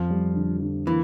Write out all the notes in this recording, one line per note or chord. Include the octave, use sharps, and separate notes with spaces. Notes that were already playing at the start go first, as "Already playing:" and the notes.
Already playing: F2 F3
G3
D3
D3
E3 A#3